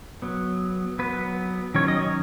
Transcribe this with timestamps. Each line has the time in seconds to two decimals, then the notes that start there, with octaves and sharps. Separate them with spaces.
0.22 F#3 B3
0.99 F#3 B3 B4
1.74 D#3 F#3 C#4 C#5
1.88 D#5
1.99 C#5